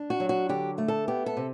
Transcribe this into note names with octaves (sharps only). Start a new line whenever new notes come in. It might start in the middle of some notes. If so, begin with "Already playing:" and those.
Already playing: D4
F#4
F#3
F#4
D3 G4
A3
A4
B3 G4
A4
C3